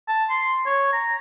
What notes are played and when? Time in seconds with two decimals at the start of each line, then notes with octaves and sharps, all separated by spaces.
0.08 A5
0.30 C6
0.66 C#5
0.93 A#5